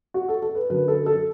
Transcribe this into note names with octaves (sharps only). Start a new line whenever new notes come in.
F#4
A4
A4
B4
F#2 D3 F#3 B4
A4
A4